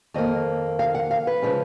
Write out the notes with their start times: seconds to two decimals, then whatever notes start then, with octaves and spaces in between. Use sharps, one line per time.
0.14 F2 D#3 A#3 D#5
0.79 F5
0.95 F#5
1.11 F5
1.27 B4
1.42 C#3 F3 G#3 C#4